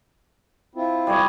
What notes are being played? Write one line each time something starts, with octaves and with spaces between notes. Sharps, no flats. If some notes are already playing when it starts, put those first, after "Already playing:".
C4 E4 F4
G3 G#4 C#5